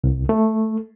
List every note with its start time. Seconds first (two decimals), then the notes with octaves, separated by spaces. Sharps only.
0.04 C2
0.29 A3